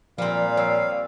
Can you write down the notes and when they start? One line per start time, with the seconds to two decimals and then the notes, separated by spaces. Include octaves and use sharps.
0.18 A#2 F3 G3 C4 F5
0.57 G3 C#5 E6 C7